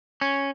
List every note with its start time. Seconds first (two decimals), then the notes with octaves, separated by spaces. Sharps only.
0.21 C#4